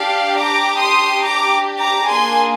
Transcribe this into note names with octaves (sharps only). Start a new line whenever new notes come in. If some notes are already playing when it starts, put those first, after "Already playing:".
Already playing: D4 G4 D5 F5
A#5 D6
C6 D#6
A#5 D6
A#5 D6
A#3 D4 G#4 G#5 C6